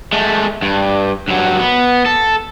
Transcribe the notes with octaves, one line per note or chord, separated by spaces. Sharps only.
G#3 A3
G2
G2 F#3
B3
A4